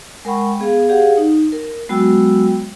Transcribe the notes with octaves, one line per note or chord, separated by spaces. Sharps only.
G#3 A#4 F#5 G5 B5 C#6
B3 G#4 F5
G4 G#4 D5 F5 F#5
D#4
A#4
F#3 G#3 B3 F#4 G5 E6